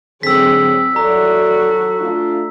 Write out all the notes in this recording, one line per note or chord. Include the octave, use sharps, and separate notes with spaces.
G#2 D3 F#3 C4 G#4 E6 B6
F#3 E4 F#4 A4 D5 A#5
A3 D4 F4